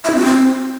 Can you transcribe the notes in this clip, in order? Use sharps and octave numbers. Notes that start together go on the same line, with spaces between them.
E5
E4
C4
F#4
C4